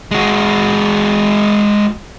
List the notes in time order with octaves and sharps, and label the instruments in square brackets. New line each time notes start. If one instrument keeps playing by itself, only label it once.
[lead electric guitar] G#3 F#4